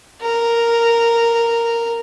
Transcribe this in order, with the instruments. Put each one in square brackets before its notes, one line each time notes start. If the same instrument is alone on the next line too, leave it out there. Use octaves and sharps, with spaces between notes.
[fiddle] A#4